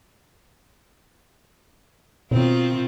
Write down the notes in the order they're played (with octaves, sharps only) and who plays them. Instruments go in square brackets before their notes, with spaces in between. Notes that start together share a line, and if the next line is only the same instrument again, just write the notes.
[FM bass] B2 [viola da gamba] D#3 C4 F4